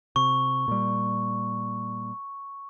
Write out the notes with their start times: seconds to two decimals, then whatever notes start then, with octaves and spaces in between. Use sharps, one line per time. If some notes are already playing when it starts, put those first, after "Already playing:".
0.16 C3 C#6
0.68 A#2 G3